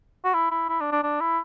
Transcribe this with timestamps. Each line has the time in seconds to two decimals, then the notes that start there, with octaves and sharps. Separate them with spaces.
0.24 F#4
0.34 E4
0.51 E4
0.69 E4
0.80 D4
0.92 D4
1.03 D4
1.20 E4